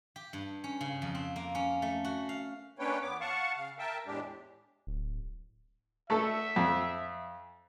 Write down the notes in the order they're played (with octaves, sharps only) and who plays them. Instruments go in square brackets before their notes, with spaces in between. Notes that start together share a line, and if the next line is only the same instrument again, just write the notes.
[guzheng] G4
G2
C#4
C#3
F2
C4
A#3
C#4
A3
F#4
F5
[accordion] A#3 C#4 D4 B4 C#5 G5
E2 B3 D6
F5 F#5 A5 C#6
C#3 F5
A#4 E5 G5 A5
E2 A2 G#3 D4 G4
[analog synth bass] D1
[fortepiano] A3 A4 [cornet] E5
[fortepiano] F2